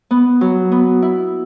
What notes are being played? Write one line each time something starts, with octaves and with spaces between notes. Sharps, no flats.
B3
F#3
B3
E4